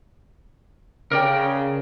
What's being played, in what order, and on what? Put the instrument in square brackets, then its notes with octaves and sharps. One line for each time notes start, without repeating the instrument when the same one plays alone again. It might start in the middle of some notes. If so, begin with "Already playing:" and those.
[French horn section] C#3 [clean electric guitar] A#4 D5 G5